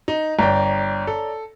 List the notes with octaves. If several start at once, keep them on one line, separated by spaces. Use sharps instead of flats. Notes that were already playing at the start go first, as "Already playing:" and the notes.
D#4
G1 C#5 D5 G5 A#5
A4